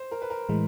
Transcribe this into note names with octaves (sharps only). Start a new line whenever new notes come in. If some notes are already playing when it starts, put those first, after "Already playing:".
Already playing: C5
A#4
B4
A#4
A2 E3 G#3